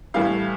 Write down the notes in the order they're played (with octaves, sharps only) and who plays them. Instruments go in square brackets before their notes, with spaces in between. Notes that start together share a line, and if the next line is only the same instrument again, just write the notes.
[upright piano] A2 E3 G3 F5